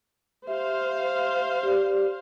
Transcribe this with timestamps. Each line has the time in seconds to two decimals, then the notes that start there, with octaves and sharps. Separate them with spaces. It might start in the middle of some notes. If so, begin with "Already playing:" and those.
0.47 G4 C5 E5 F5
1.63 G4 D5